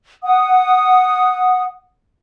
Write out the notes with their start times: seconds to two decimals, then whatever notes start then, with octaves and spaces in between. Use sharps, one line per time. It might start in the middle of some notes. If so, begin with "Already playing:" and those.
0.23 F#5 D#6